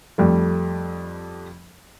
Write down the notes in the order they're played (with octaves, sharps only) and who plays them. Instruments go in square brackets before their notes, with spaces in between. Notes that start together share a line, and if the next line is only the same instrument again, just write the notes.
[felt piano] F2 G3 A3